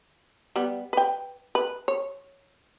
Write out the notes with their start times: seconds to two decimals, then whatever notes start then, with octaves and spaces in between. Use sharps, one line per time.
0.56 G3 B3
0.93 B4 G5
1.55 B4
1.88 C#5